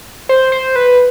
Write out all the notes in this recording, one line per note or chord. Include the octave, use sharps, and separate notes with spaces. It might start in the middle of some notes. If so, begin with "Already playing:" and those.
C5
C5
B4